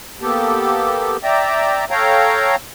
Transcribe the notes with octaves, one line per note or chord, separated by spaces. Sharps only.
A#3 B3 G4 A4
D5 E5 G5 A#5
A4 C#5 F5 G5 A#5